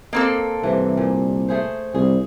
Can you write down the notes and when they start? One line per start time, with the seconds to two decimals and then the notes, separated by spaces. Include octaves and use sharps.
0.13 A#3 C4 A4 D#5
0.63 C2 C3 E3
0.97 A#2
1.48 A3 G#4 C5
1.94 C2 G#4